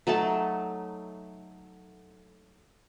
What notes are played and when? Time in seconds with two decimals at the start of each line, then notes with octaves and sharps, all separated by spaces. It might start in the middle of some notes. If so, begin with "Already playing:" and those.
0.07 F#3 A3 D#4 A5